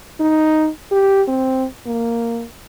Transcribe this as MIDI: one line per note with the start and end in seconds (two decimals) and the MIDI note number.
0.21 0.69 63
0.92 1.22 67
1.28 1.65 60
1.86 2.46 58